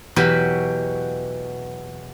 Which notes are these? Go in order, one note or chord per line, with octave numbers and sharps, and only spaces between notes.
E2 B2 F#3 G4 B5